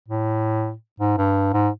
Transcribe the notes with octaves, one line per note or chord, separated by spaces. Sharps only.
A2
G#2
G2
G#2